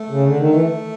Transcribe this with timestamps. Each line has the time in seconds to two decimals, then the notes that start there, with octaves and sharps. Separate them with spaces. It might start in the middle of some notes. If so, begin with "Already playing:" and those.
Already playing: A3
0.10 C#3
0.24 D3
0.37 D#3
0.52 E3 A3